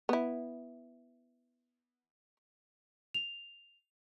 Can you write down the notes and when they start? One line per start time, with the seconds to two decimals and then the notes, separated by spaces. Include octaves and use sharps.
0.09 B3 E4
3.14 F7